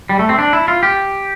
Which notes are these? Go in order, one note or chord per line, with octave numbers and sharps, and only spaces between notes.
G3
A3
C4
D4
E4
F4
G4